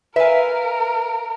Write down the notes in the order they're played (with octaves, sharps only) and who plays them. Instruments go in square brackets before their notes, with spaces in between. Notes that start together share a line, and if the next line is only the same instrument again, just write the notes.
[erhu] A#4 [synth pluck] B4 F5 [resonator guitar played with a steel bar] E5 G#5